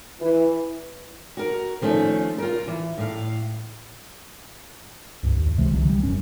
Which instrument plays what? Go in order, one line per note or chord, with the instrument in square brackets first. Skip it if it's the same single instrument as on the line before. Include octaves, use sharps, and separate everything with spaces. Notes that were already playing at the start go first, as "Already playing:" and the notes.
[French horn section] E3
[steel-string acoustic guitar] F#4 A#4
D#3 F3 A3 C#4
F4 A#4
E3
A2 F5
[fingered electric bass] C#2 G2
D#2
C#2 C3 E3 G#3
C2 D3 E3 F#3
G3
E1 F#2 C#4